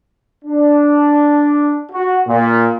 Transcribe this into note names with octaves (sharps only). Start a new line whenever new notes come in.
D4
F#4
A#2